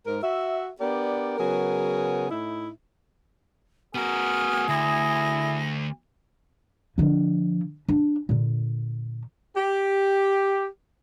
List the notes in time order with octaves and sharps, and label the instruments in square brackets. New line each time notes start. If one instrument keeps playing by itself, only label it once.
[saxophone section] G#2 A#4
F#4 E5
B3 D4 G4 A#4 D5
C#3 F#3 B3 G#4 A#4
A2 D#4 E4
[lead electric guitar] B3 A#4 [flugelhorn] F#4 [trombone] G#4 [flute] F6
[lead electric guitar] D2 [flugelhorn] E4 [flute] A#6
[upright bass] D3 F3
D4
A#2 D3
[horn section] G4